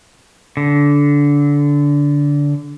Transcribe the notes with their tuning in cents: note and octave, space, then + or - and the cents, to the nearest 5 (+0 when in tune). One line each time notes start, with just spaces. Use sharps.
D3 -20